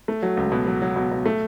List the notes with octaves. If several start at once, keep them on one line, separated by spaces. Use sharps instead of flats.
A3
F#3
C#2
B2
F#3
F#3
B2
B2
A3